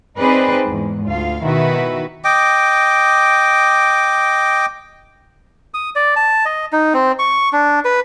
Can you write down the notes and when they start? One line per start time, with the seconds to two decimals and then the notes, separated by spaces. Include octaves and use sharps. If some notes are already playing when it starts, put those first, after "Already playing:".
0.18 C4 D#4 G#4 B4 C5 D5
0.64 E2 G#2
1.05 D2 F4 F5
1.42 B2 D#3 E4 F#4 B4 E5
2.24 D#5 G5 D6
5.74 D#6
5.95 D5
6.16 A5
6.46 D#5
6.73 D#4
6.94 C4
7.19 C#6
7.53 D4
7.85 B4